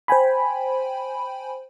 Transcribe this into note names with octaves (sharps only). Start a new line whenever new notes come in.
C5 G5 G#5 B5